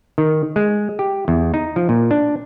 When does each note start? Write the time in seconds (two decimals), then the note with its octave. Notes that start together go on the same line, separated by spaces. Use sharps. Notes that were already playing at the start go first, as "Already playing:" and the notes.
0.18 D#3
0.56 G#3
0.99 G4
1.28 E2
1.54 D#4
1.76 F3
1.89 A#2
2.11 D4